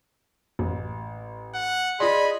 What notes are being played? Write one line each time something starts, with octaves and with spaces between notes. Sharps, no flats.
A1
F#5
F4 G#4 D5 D#5 G#5 B5 C6